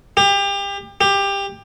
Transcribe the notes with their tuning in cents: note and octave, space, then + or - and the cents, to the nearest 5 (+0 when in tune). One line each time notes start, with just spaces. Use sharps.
G4 +30
G4 +20